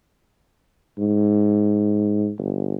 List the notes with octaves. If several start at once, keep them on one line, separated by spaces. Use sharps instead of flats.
G#2
G1